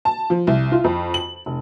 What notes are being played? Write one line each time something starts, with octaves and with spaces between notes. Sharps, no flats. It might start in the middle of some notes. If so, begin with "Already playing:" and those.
A5
F3
C2
F4
F2
F#7
F1